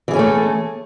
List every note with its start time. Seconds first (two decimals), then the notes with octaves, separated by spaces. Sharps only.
0.08 E3
0.11 G#4
0.13 C#4
0.16 A4
0.19 A3